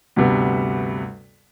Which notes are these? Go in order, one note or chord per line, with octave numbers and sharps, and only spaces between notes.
D2 G2 C3 B3